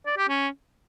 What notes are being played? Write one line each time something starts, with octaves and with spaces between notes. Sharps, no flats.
D5
G4
C#4